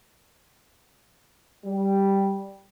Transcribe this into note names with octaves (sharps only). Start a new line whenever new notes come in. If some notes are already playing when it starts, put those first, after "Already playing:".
G3